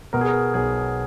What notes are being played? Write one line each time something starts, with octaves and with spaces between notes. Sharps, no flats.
B2 A#4
G#4
A#4
B1 G#4